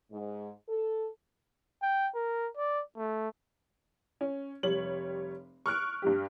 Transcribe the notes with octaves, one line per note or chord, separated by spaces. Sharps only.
G#2
A4
G5
A#4
D5
A3
C#4
F1 G3 C#5 F#7
C#6 F6 F#6 D7
G2 G3 G4